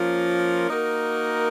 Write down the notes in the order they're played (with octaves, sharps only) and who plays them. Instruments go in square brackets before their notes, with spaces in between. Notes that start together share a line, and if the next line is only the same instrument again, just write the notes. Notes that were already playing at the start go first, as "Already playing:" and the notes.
Already playing: [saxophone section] F3 A#3 C#4 F4 A#4
A#3 D#4 F#4 A#4